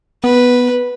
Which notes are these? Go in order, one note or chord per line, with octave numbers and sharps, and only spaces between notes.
B3 B4